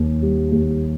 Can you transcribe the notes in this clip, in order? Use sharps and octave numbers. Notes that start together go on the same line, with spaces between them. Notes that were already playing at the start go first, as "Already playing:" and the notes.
Already playing: D#2
G3
D#2